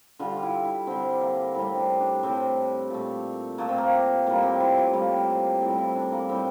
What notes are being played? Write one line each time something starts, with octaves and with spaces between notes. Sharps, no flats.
D3 G3 F4
F4
E4
E4
D3 G3 C4
A#3
A2 G3 C4
D4
D4
A2 G3 C4
A#2 A3
A#2 A3 A#3
C4
A#3
A2 G3 A#3
C4
E4
F4
A2 G3 A#3
C4
A2 G3 C4
E4
D4
A#3
A2 G3 C4